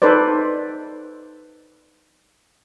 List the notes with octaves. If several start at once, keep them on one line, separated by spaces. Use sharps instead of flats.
D#4 A4 B4 C5 D5